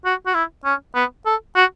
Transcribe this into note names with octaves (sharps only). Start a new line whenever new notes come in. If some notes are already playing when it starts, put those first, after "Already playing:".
F#4
F#4
E4
C#4
B3
A4
F#4